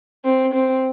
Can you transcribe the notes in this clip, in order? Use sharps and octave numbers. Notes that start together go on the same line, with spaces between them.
C4
C4